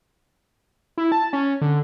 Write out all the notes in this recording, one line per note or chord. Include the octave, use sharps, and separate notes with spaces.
E4
A5
C#4
D3